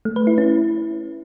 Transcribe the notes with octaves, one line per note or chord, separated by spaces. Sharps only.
A3
B4
E4
C#4